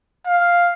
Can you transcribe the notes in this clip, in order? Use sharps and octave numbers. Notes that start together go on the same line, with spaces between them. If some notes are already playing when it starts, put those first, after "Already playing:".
F5